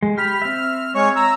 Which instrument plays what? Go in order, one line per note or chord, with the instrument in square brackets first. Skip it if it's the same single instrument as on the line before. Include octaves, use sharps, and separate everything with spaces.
[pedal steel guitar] G#3
[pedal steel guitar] G4 B5 [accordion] F6
[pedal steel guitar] C4 E5
[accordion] G#3 C#5 C#6
A#5 E6